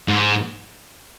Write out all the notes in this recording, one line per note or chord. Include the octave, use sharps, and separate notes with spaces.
G#2